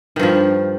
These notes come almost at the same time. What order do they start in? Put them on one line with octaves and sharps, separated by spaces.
D#3 G2 F3